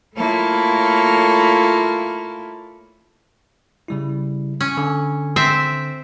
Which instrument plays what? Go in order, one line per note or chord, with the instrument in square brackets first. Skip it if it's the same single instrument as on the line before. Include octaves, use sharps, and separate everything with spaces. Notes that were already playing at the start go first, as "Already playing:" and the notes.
[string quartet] A3 A#3 E4 F4 A4 C#5
[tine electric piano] C#3 G3 E4
[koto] C#4
[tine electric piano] D3
[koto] C4 C5 E5